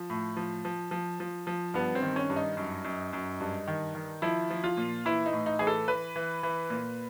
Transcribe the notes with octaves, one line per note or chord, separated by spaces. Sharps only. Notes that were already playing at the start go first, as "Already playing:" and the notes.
Already playing: F3
A2
F3
F3
F3
F3
F3
G2 B3
C4
D#3
C#4
G2
D#4
F#2
F#2
F#2
G2
D#3
D#3
F3 E4
F3
F4
A#2
E3 E4
D#4
A2
D#4
E3 G#4
A4
E3 B4
E3
E3
A#2